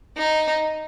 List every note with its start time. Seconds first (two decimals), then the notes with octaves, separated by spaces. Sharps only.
0.18 D#4